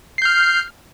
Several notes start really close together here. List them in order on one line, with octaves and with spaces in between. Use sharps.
C7 G6 F6